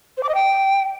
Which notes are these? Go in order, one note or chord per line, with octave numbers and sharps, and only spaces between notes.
C5
D6
D#5
G5